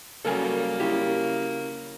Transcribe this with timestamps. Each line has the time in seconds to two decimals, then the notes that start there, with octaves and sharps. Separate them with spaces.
0.25 C#3 F#3 G3 A#3 A4 A#4 G#5
0.80 C#3 E4 G4